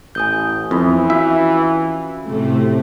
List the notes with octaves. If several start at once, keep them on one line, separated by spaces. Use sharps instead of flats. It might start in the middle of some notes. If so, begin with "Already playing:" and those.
A1 G#5 D#6 G6
F2 E3 E4 B5
C#4 F4 F#4 E5
A2 C3 A3